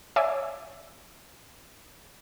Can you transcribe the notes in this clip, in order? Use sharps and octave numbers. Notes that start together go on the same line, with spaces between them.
C#5 D5 E5 G#5